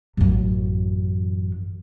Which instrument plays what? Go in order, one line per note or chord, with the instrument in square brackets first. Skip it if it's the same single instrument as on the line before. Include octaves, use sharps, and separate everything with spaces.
[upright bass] A1 F#2